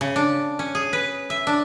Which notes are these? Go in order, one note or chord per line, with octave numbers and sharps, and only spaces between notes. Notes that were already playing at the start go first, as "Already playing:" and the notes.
C#3
D4
C#4
G#4
B4
E5
D4